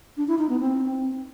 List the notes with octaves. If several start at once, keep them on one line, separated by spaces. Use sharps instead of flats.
D4
E4
D#4
B3
C4